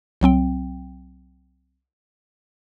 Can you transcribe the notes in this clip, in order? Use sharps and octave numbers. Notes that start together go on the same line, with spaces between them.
C2 F#3 C4 G5